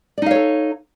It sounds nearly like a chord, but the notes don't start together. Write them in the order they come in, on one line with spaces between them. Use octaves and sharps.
D5 D#4 F5 C#5 A4